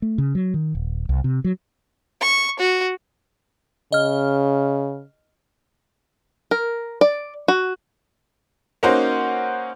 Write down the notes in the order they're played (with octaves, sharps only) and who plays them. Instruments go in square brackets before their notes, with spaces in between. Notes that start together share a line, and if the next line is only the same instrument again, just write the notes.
[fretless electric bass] A3
C#3
F#3
D#3
D#1
C2
C3
F#3
[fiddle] C#6
F#4
[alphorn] C#3 [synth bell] D#5 F6
[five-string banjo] A#4
D5
F#4
[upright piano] A#3 C#4 D#4 F#4 C5